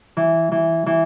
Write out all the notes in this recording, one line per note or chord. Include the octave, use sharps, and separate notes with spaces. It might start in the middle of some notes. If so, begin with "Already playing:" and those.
E3
E3
E3